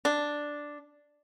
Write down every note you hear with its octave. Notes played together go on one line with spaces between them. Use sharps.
D4